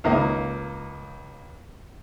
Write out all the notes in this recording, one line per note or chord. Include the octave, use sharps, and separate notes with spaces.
C#2 A#3 D#4 D#5